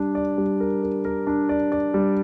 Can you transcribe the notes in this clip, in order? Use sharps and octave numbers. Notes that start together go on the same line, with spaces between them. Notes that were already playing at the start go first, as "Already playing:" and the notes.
Already playing: G3 D4 D5
D5
G3
A#4
A#4
A#4
D4
D5
D5
G3